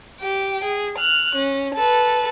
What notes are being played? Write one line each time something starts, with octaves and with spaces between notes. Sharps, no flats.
G4 G5
G#4
F6 F#6
C#4
A4 B4